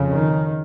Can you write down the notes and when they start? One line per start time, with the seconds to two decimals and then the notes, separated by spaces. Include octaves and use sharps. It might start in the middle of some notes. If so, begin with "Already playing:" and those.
Already playing: F2 C#3
0.10 D#3